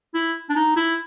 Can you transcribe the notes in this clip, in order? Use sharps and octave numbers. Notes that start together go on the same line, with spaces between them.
E4
D4
D#4
E4